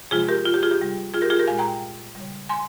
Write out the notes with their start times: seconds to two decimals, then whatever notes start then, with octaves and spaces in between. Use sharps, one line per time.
0.11 C3 F3 G#3 F4 G#4
0.28 G4 A#4
0.45 F4
0.54 G4
0.63 F4 G#4
0.71 G4
0.80 C3 G3
1.14 F4 G#4
1.22 G4 A#4
1.30 F4 G#4
1.40 G4 A#4
1.47 A#2 G#3 F5 G#5
1.58 G5 A#5
2.15 G3
2.20 C#3
2.49 G#5 C6